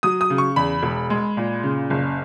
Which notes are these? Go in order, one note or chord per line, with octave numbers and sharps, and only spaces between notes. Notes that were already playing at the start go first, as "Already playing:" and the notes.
F#3 D#6
D#6
C#3
C#6
E2 B5
E1
G#3
A#2
C#3
F#1